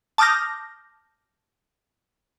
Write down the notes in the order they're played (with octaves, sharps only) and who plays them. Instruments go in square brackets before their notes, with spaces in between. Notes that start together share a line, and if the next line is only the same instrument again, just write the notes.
[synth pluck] A5 D6 D#6 F6 G6 A#6